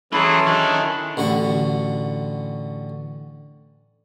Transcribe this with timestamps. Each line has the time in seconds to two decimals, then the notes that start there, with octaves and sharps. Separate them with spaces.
0.12 E3 F#3 C#4 E4 G#4 A4 B5 C6
0.47 D#3 D4
1.17 A1 D3 F#4 C#6